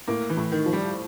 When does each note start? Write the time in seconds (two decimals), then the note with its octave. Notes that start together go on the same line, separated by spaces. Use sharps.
0.07 A2 A#3
0.30 E3
0.37 A2
0.52 D#3
0.66 F3
0.73 G3